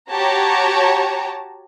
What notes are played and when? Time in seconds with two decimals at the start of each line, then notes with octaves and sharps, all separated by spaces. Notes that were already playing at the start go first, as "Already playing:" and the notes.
0.13 F#4 G4 C#5 A5 A#5